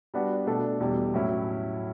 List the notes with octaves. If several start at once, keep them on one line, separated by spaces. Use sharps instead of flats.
G3 B3 D4 F#4
B2 A3 D4 A4
E2 B2 G3
A2 F#3 C#4 E4 A4